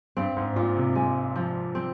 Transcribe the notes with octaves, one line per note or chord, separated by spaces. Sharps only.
G2 C4
G#2
A#2 F4
C3
G#3
F3
C4